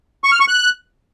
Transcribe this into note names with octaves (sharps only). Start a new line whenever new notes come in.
C#6
F6
C#6
F#6